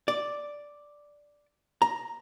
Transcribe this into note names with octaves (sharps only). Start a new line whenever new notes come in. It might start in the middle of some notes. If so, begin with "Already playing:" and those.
D5
A#5